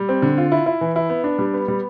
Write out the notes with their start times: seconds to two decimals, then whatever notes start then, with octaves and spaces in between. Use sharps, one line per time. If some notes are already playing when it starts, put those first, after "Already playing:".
Already playing: G3
0.09 C4
0.22 D3
0.38 F4
0.52 E4
0.66 E4
0.81 E3
0.96 E4
1.09 B3
1.24 D4
1.39 G3
1.54 B3
1.68 G3